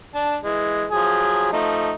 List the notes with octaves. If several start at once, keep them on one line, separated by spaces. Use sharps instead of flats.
D4 A5
E3 G#3
F3 F#3 G#4
F3 A3 D#4